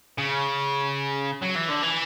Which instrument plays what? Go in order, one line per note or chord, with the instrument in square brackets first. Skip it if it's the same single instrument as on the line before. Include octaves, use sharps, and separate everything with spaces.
[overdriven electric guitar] C#3
F#3
E3
D3
E3